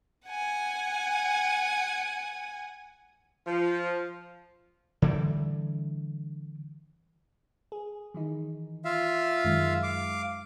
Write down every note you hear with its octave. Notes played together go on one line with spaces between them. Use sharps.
F#5 G#5
F3
D3 E3 G3
G#4
D#3 E3 D#4
F4 E5 F5
F#2 D#3 G#3
F5 D6